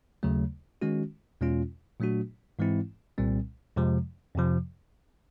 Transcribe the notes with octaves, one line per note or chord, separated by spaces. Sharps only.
D#2 C#3 F#3 A3
D#3 G#3 C#4 F#4
E2 B2 G#3 C#4 F4
A#2 F#3 A3 D4 F#4
G#2 E3 G#3 C4 E4
C2 A#2 G3 C4
F2 C3 F3 G#3
F2 C3 F3